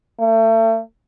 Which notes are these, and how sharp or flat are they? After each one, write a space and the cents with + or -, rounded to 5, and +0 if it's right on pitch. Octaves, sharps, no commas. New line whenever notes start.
A3 +35